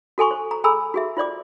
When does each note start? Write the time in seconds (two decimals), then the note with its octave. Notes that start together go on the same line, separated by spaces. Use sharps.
0.18 F#4 A4 G#5 C6 C#6
0.31 C5
0.51 A#5
0.64 G#4 A4 G#5 A#5 B5 E6
0.94 F#4 G#4 E5
1.17 F4 C5 D5 D6